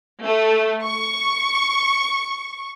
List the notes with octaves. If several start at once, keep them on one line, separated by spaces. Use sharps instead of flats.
A3
C#6